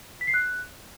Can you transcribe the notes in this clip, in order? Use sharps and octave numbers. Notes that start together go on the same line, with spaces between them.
B6
C7
F#6